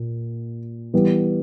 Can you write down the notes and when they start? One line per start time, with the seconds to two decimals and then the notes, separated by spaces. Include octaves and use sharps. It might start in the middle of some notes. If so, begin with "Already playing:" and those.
Already playing: A#2
0.93 E3 G3 B3